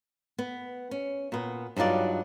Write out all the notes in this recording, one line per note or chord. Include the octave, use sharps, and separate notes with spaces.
B3
C#4
A#2 B3
G2 F#3 D#4 F4 D5